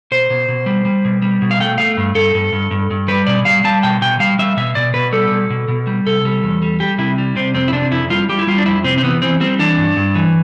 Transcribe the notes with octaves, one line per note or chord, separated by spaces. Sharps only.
B2 C5
B2
B2
G3
G3
B2
G3
B2
F5
A3 G5
A3 F5
G2
G2 A4
G2
G2
G2
G2
G3 B4
B2 D5
G3 F5
G3 A5
B2 G5
B2 G5
G3 F5
G3 E5
B2 E5
B2 D5
B2 B4
G3 A4
B2
B2
B2
G3
C3 A4
G3
E2
G3
G3 G4
C3 E4
G3
C3 C4
F2 C4
E4
C3 D4
F2 E4
G3 F4
G3 G4
E4
G3 F4
D4
F2 E4
C3 C4
C4
E3 B3
E3 C4
G3 C4
E3 D4
G2
G2
E3